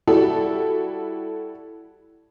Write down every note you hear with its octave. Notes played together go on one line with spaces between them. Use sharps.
G3 E4 F#4 A4